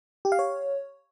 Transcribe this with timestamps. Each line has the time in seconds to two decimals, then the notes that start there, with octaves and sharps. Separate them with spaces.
0.25 G4
0.32 F5
0.39 C#5